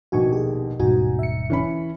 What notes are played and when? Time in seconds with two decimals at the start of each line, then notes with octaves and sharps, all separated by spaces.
0.12 A#1 D#2 B2 F#4 G#5 C#6
0.33 G4 G#4
0.79 D#1 G#2 B2 D#4 F#4 G#5
1.19 E5 C#7
1.50 E3 C#4 B5